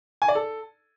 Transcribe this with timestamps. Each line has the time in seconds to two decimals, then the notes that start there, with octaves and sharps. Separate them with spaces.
0.22 G#5
0.28 D5
0.35 A4